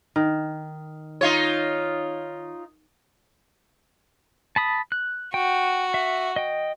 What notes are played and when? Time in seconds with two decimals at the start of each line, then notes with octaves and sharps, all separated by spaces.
0.16 D#3
1.21 D#4 F4 C#5
4.56 A5 B5 D#6
4.92 F#6
5.34 F#4 G5
5.94 E5
6.36 D#5 G5